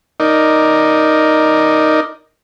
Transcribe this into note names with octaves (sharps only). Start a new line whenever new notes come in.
D#4 A#4 D5